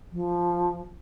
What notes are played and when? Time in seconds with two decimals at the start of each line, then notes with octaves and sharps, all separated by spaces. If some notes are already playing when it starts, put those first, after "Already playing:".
0.12 F3